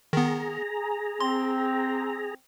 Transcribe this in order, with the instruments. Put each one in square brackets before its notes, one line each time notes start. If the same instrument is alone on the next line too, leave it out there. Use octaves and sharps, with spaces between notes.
[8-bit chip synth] D#3 B3 [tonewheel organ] G#4 A#5
[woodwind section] C4 [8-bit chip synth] C6